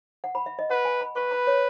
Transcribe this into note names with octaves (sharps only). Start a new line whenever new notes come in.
F#5
B5
E5
D#5
B4 F#5
G#5
B5
B4 C#6
B5
C#5